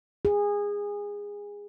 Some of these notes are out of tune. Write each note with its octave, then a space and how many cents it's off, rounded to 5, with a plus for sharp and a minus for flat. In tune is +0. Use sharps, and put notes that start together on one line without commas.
G#4 -20